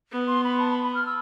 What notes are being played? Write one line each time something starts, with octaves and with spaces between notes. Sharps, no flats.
B3
C6
B5
A5
B5
B5
F6
E6